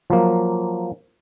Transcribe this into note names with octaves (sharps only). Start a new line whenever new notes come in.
F3 F#3 A#3